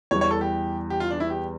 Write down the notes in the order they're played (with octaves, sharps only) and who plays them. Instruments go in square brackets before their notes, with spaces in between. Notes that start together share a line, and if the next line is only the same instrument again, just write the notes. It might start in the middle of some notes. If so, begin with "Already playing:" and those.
[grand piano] E2 E3 G3 [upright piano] C#5
[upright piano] C#5
A4
G4
G4
F4
D4
E4
G4